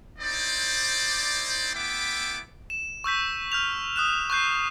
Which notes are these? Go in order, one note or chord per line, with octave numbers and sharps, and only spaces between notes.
C4 D#4 E4 C5 D5
A3 B3 E4 E5 G5 D6
E7
C#6 E6 G6 B6
F6 G6 F7
D#6 F#6 E7
C#6 F#6 G6 C7